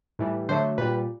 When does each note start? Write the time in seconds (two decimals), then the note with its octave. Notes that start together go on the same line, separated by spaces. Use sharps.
0.19 A2 E3 G3
0.49 D3 F#3 A3 C5
0.78 A#2 G3 B4